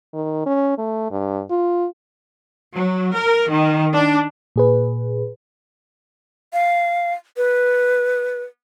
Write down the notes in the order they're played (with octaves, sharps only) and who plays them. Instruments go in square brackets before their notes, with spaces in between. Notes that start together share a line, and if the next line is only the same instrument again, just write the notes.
[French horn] D#3
C#4
A3
G2
F4
[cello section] F#3
A#4
D#3
D4
[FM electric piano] A#2 G#4 B4
[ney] F5
B4